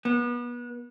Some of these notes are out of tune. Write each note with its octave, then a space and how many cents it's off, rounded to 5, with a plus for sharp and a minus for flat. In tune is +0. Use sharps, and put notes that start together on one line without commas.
B3 -30